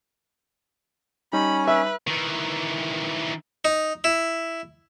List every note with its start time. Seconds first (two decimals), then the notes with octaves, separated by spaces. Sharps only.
1.33 G3 C#4 D#4 B5
1.67 B4 E5
2.07 D#3 E3
3.65 D#4
4.04 E4